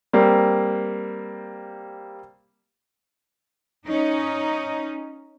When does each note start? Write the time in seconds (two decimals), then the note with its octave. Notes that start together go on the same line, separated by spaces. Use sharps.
0.13 G3 A#3 C4
3.87 C#4 D#4